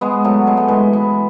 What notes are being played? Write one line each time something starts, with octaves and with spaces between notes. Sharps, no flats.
G#3 B3
F#3 A3
G#3
A3
E3 G#3
E3